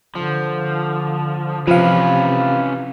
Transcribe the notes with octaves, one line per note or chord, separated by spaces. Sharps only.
D3 F3
C3 E3 F3 C#4 B4 F5